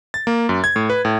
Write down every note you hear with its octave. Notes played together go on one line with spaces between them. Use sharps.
A6
A#3
F#2
G#6
A2
B4
A2